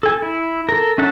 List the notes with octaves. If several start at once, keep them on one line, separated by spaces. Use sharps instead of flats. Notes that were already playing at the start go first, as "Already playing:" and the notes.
A4 G#5
E4
A4 A#4
C#4 E5 F#5 A5